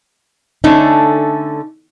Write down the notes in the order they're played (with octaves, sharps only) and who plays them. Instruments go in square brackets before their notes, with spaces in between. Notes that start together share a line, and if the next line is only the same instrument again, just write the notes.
[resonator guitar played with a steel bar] D3 A3 C#4 [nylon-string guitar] D#4